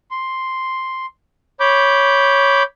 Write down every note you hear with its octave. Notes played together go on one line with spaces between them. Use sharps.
C6
C#5 B5 D6 G6